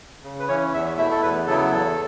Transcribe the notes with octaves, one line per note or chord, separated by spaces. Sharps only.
C#3
B4
E3 C#4 C#5
E2 E5
B2 A3 E4 E5
A4
E2 B4
C#3 F#3 B3 E4 A4
E2 A4